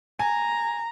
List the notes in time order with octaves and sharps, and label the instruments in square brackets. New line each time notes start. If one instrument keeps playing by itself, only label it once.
[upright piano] G#5 [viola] A#5